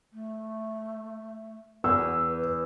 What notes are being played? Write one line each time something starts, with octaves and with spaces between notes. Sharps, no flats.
A3
E2 B4 E6